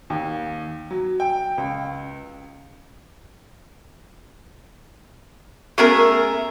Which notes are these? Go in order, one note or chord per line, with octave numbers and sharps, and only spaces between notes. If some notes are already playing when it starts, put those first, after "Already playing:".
D#2
F#3
G5
C#2
A3 B3 C#4 F#4 G#4 A#4